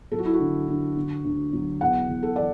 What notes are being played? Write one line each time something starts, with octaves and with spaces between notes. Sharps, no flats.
F#3 A4
F#4
E4
F#4
D3
D3
D3
D2
F#3
E2 F#5
E2
A4
E3 D5